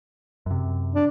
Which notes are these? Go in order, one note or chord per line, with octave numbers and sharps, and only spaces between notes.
F#2 C3
D4